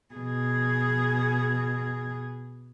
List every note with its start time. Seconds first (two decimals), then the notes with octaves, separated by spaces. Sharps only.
0.15 B2 G#4